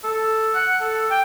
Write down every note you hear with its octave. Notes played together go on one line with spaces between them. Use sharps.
A4
F#5
A4
G5